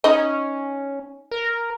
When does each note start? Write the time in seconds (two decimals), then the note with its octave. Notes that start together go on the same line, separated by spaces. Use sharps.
0.04 C#4 D#4 D#5
1.31 A#4